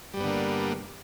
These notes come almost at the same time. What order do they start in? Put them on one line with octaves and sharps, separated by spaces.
G3 G2 B3 D3 A#3